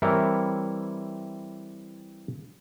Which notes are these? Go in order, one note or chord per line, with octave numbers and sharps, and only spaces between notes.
E3 G3 C4 E4 A#4 C#5